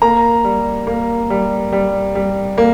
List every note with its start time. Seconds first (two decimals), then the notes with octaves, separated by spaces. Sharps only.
0.02 A#3 A#5
0.45 G3
0.87 A#3
1.30 G3
1.73 G3
2.15 G3
2.58 A#3